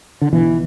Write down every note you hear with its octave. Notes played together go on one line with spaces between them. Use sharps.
D3
B1 B2 E3